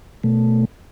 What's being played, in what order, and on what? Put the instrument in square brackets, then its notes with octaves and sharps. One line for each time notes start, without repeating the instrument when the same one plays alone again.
[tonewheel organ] B2 A3